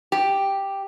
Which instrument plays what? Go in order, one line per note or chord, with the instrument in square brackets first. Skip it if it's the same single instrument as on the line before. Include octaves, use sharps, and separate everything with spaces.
[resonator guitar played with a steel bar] G4